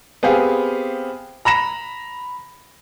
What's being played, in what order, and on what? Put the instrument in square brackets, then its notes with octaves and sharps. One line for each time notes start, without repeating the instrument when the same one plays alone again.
[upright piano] B3 C4 G4 G#4 F5
A#5 B5 A#6 E7